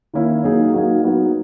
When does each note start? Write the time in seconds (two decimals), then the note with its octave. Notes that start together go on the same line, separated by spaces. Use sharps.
0.14 D#3 A#3 C#4 E4
0.44 F#3 A#3 D#4 G#4
0.73 F#3 A#3 D#4 G#4
1.04 F#3 B3 D#4 F#4